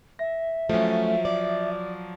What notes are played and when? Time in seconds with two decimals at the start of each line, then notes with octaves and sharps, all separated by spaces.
0.19 E5 A#6
0.69 F3 F#3 A3 C#4
1.25 D5